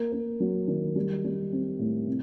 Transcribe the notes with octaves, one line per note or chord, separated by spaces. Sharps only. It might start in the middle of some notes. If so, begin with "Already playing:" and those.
Already playing: A#3
A#3
F#3
D#3
G3
G3
C4
A2
C3